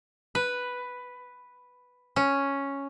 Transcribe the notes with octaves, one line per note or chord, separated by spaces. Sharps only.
B4
C#4